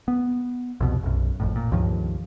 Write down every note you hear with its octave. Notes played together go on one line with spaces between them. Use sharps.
B3
C2 F2 B2
B1 F#2
G#1 F2 A2
A#2
C#2 G2 D#3 F3